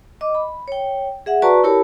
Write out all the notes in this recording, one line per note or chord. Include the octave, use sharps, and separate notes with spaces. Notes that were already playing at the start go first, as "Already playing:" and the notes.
D#5 D6
B5
C#5 G5
G#4 E5 F#5
F#4 B4 D5 A5 A#5 C#6
E4 G4 A#4 C#5 A5 B5